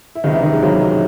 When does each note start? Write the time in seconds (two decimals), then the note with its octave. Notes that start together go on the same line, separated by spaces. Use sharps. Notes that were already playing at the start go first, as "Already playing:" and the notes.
0.15 E4
0.24 C#2 C3 D#3 D#4
0.33 E3 E4
0.43 D#3 D#4
0.53 G#3
0.62 C#2 C3 D#3 F#3
0.81 G#3